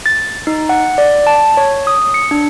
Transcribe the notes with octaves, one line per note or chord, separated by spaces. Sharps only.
A6
D#4
F#5
D5
A5
C#5
D#6
C#7
D4